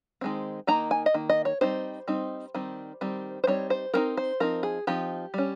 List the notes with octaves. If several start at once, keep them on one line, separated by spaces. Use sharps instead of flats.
D#3 G#3 C4
D#3 A#3 D#4 A#5
G#5
D#5
D#3 A#3
D#5
C#5
G3 C4 D#4 C5
G3 C4 D#4
D#3 G3 C4
D#3 G3 C4
C5
G3 C4 D#4 C#5
C5
G3 C4 D#4 A#4
C5
F3 C4 D#4 A#4
G#4
F3 C4 D#4 G4
G3 C#4